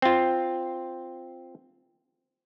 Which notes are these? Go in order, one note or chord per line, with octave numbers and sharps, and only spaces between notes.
C4 F4